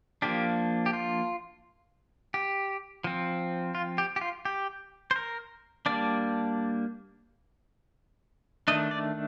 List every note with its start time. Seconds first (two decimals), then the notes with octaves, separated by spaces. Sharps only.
0.22 F3 A#3 D4 G4
0.86 G4
0.93 F4
2.34 G4
3.04 F3 C4
3.75 F4
3.98 G4
4.16 G4
4.21 F4
4.45 G4
5.11 C5
5.16 A#4
5.86 G3 A#3 D4 D5
8.68 D#3 A3 D4 D#5
8.91 D5